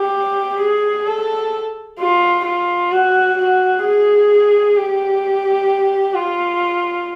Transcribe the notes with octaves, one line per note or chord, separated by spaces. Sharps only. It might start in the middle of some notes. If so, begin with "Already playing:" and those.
Already playing: G4
G#4
A4
F4
F4
F#4
F#4
G#4
G4
F4